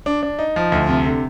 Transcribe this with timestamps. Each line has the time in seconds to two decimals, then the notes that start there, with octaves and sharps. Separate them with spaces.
0.06 D4
0.23 D4
0.39 D#4
0.56 F3
0.72 D2
0.89 C3
1.05 D3